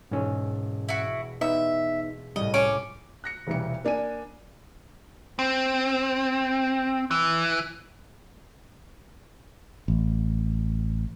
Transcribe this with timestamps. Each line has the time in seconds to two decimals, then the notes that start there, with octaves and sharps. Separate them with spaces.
0.11 E1 G#2 C#4 E6
0.89 E4 F#4
1.41 B3 D#4 E5
2.36 C2 A2 G3 D#5
2.54 C#4 D6
3.24 F#6 A#6 C#7
3.47 E1 C2 E3 G3 C#7
3.84 A#3 D4 G#5 D#7
5.39 C4
7.11 E3
9.88 A1